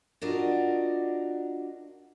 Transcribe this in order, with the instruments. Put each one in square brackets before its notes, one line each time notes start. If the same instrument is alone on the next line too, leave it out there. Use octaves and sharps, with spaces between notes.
[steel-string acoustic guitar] D4 F4 F#4 A#4 D5 D#5